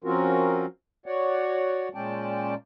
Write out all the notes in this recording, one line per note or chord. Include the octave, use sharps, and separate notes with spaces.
F3 C4 C#4 F4 F#4 A#4
F#4 C#5 D5 F#5
A#2 G#3 C#4 D5 G5 A5